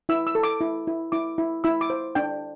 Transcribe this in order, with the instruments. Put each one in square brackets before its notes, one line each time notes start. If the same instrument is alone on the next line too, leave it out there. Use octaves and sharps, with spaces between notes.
[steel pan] E4 E6
E6
A4
D6
E4
E4
E4 D6
E4
E4 E6
D6
C5
D4 G5